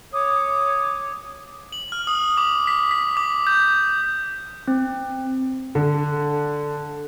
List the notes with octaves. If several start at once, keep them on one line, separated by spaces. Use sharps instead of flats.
C#5 D6 D#6
F#7
F6
D#6
D6
B6
B6
D6
G6
C4
D3